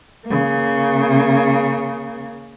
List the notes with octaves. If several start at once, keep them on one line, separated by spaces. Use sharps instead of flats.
C#3 A#3